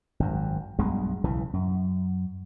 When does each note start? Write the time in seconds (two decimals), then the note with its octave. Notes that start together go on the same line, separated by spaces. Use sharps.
0.20 G#1 F#2
0.79 B1 G2 B2 G#3
1.24 B1 C#3 E3
1.53 F#2